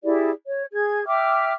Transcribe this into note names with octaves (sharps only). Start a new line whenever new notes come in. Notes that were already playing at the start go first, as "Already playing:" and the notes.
E4 G4 G#4 D5
C#5
G#4 G#6
E5 G5 D6 F6